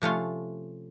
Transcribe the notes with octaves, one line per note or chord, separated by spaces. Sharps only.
C3 F3 A3 C#4 F4